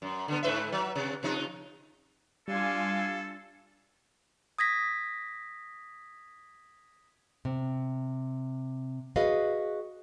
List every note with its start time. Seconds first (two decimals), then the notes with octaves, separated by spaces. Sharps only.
0.02 F#2
0.28 D3 B3
0.43 G#2 B4 E5
0.72 F#3
0.96 C3
1.23 C3 F3 D#4
2.48 G3 D4 F4 A4 F5 G#5
4.59 D#6 G#6 A#6 B6
7.45 C3
9.16 F#4 G#4 B4 D#5 F5